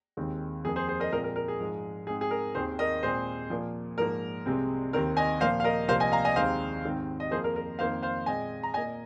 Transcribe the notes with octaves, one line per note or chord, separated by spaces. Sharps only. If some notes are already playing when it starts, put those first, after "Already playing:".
D#2 D#3 G#3 C4
F2 F3 A#3 G#4
G#4 C5
G#4 C5
A#4 D#5
A#2 F3 G#3 C4 A#4 D#5
A#4
A#4
G#4
G#2 F3 G#3
G#2 G#3 C4 G#4
G#4
A#4
D#2 D#3 C4 G#4 C5
A#4 D#5
A#2 G#3 C4 G#4 C5
A#2 F3 A#3
G#2 F3 A#3 A#4
C2 C3 G#3 C4
D#2 D#3 C4 A#4
D#5 G#5
A#2 F3 A#3 C5 F5
F5
A#4 D#5
C2 C3 F3 A#3 C5 F5
D#5 G#5
F5 A#5
D#5 G#5
D#2 D#3 G#3 C4 C5 F5
G#2 D#3 C4
D#5
F2 F3 A#3 G#4 C5
A#4
A#4
F2 D#3 A#3 C5 F5
C5 F5
A#2 G#3 C4 D#5 G#5
A#5
A#2 A#3 D#5 G#5